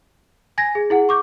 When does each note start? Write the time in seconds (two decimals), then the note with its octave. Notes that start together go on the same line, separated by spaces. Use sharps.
0.58 G#5 G#6 A#6
0.75 G#4
0.90 E4 G#4 F#5
1.09 C#6 D6 G6